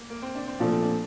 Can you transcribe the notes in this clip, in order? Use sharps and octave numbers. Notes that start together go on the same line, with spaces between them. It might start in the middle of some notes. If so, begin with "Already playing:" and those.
Already playing: A#3
A#3
C4
D4
C4
A#2 F3 A3 D4
C4
D4